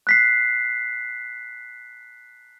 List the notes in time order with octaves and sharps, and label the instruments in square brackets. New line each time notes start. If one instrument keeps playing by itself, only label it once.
[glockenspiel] F#6 B6 C7